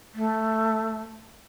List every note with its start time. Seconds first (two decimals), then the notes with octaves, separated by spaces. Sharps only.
0.14 A3